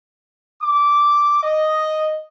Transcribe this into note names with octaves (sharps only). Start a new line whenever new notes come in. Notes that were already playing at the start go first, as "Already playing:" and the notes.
D6
D#5